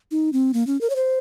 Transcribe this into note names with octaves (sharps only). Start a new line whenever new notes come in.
D#4
C4
A#3
C#4
A#4
C#5
C5